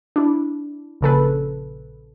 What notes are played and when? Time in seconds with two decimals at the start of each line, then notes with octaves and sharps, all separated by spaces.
0.16 D4 E4
1.01 A#1 C#3 A4 B4